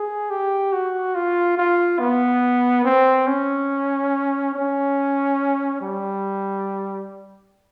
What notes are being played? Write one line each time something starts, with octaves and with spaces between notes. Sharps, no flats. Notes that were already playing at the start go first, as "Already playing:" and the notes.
Already playing: G#4
G4
F#4
F4
F4
B3
C4
C#4
C#4
G3